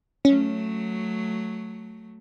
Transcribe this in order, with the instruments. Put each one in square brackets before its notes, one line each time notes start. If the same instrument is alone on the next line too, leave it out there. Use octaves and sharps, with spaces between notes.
[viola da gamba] F#3 A3 [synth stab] C#4